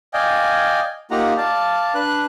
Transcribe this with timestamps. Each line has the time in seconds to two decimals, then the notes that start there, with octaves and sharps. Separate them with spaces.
0.14 D5 D#5 F5 G5 G#5
1.11 A#3 D#4 F4 G4 F#5 A#5
1.37 D5 F5 A5
1.94 D4 B4 F#6